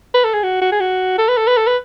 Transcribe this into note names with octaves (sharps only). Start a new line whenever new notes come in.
B4
A4
G#4
F#4
F#4
G#4
F#4
A4
B4
A4
B4
A4
B4